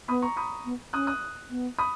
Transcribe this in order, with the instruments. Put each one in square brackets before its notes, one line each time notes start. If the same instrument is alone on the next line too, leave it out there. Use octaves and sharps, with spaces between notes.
[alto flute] B3 [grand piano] B5 D#6
[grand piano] A#5 C#6
B5 D#6
[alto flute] B3
[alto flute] C#4 [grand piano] D#6 F#6
[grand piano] D#6 F#6
[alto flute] B3
[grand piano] B5 D#6